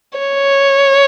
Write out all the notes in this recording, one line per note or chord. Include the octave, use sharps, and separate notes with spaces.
C#5